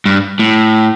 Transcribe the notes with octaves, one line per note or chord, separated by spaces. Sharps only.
G2
A2